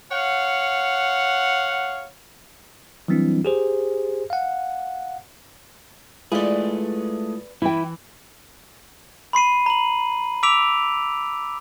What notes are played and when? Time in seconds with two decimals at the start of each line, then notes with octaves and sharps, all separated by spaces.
0.12 C#5 F5 F#5
3.08 E3 F#3 G3 C4 D4 E4
3.45 G4 G#4 C5
4.30 F5 F#5
6.32 G#3 A3 E4 F4 G#4 B4 D5
7.62 E3 E4 G5
9.33 B5 C6 C7 D#7
9.66 A#5 F#7
10.43 D6 E6 B6 D7 F7